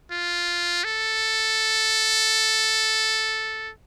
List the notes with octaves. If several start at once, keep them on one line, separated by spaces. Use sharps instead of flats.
F4
A4